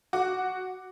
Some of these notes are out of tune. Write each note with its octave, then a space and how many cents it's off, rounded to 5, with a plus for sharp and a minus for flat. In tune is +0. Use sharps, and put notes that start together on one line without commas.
F#4 +0 D6 +0